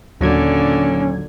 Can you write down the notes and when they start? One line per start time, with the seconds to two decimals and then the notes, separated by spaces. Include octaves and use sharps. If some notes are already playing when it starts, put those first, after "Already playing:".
0.21 D#2 A#2 D3 F#3 C#4 G#6